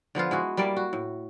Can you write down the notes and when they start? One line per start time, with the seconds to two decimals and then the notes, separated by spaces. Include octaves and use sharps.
0.15 D3 F3 B3 F4
0.31 G#3 E4 F#4
0.57 G3 A#3 E4 D5
0.77 F#4
0.93 A2